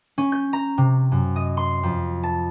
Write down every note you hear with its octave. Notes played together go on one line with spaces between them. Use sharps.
C#4
G6
A#5
C3
F#2
D#5
C6
F2
A5